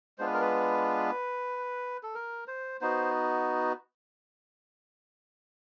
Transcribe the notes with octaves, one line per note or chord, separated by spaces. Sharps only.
G#3 B3 D4 F4 C5
B4
A#4
B4
A4
A#4
C5
B3 D#4 F#4 C5